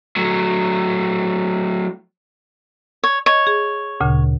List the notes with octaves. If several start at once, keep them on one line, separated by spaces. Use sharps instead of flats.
F#3 A3
C#5
C#5 D#5
G#4
D2 A#2 C#3